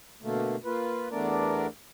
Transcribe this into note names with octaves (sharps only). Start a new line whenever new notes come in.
B2 D3 A3 A#3
A#3 F4 B4
E2 A3 B3 D4 A#4 D5